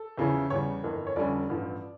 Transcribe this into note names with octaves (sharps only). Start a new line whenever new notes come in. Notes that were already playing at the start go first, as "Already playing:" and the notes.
Already playing: A4
E2 C#3 F3 C#4 E4
E2 C#3 G3 C#5
G1 F2 E3 A#3
C#5
F1 F2 D3 G3 C#4 D5
A1 G2 F3